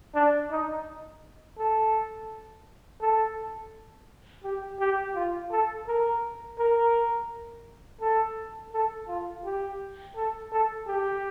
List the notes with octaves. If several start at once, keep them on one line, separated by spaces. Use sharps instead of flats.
D4
D#4
A4
A4
G4
G4
F4
A4
A#4
A#4
A4
A4
F4
G4
A4
A4
G4